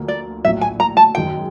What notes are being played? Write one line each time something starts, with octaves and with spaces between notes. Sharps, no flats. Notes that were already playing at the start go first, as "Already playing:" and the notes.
Already playing: D2 D3 F3 A#3
D5
A#1 A2 F#3 E5
G#5
A#5
A5
F#2 D#3 G#3 G5